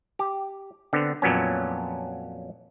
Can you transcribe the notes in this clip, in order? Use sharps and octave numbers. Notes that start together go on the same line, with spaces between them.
G4
D3 B3 C4
F2 A#2 F#3 B3 C#4